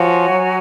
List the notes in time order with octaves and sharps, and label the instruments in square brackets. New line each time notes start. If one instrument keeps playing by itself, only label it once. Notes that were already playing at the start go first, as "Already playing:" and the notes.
Already playing: [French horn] F3 [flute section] F#4 C#5 G#5
[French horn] F#3